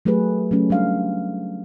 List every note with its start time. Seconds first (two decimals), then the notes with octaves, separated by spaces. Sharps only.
0.05 F#3 A3 G4 G#4 B4
0.51 F#3 A3 C#4
0.70 G3 D4 F5